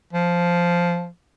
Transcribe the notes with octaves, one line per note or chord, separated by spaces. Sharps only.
F3